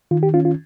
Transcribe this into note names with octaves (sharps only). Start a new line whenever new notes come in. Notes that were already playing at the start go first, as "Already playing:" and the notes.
D#3 F4
G4
C#4 F4
F4